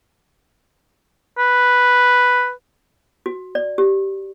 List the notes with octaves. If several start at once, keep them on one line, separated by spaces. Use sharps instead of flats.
B4
F#4
D5
G4